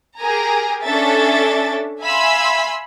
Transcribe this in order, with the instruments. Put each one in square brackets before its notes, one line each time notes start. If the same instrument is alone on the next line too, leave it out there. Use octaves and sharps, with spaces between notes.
[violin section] G4 G#4 A#4 G#5 A#5
C#4 D4 A4 E5 A6
E5 F5 G#5 B5 C6 E6